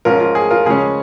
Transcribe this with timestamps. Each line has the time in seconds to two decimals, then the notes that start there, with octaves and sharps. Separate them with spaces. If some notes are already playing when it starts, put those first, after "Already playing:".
0.05 G#2 F3 C#4 F4 A#4
0.20 F4
0.35 G#4
0.50 F4 A#4
0.66 C#3 F3 G#3 C#4 G#4